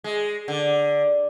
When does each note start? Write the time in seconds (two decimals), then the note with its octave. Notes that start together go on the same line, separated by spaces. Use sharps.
0.04 G#3
0.48 D3